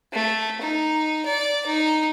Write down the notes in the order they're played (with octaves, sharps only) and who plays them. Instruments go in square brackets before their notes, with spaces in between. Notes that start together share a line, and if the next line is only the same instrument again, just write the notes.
[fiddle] A3
D#4
D5
D#4